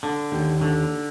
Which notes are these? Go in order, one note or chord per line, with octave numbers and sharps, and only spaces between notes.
D3
D#2
D3